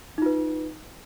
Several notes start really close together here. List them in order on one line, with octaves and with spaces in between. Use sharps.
D#4 F4 B4